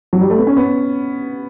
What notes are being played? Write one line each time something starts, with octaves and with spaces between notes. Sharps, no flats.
F#3
G3
A3
B3
C#4
B3